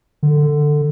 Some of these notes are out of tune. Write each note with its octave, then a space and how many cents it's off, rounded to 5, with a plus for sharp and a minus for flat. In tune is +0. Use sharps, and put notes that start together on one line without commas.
D3 +15